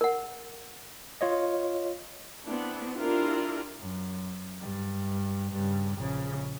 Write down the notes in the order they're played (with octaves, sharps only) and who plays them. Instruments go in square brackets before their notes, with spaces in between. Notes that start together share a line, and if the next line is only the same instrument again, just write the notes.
[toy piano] A#4 F#5
[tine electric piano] F4 C#5 D#5
[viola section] B3 C4 D4 E4
D4 E4 F4 G4 A#4
[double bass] F#2
G2
G2 C#3
A#1 C#3